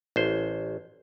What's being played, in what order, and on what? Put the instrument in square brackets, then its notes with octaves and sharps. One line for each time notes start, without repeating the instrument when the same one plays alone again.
[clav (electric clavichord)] A1 C5